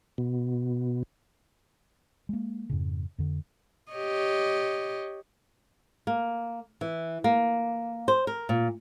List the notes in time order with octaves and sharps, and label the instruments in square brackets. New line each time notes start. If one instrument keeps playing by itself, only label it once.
[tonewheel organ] B2
[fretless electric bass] G#3 A#3
F2 G#2 C#3
F2 D3
[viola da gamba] G4 C#5 D#5
[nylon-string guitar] A#3
E3
A#3
C5
A#4
A#2